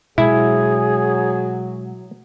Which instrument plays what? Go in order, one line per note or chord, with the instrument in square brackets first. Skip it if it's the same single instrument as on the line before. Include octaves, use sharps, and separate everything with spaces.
[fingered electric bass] B2 G#3 [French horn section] F#3 [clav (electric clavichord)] E4 [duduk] G#4